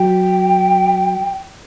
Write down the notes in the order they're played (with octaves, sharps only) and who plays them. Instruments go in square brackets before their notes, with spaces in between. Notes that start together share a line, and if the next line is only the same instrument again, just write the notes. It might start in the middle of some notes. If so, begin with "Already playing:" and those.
Already playing: [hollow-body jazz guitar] F#3 [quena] G5